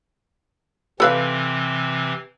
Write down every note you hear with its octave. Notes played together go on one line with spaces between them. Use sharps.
C3 E3 C4 A4 B4 F5